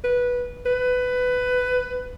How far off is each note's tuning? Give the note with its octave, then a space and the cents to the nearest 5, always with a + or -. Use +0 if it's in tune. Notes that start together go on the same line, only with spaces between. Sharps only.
B4 -10
B4 +15